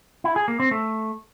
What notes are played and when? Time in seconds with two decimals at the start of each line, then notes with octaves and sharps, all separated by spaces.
0.24 E4
0.36 G#4
0.48 A#3
0.60 C4
0.71 A3